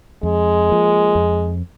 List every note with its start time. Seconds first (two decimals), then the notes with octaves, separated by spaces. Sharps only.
0.23 F2 G#3
0.69 F3 A#3
1.15 F2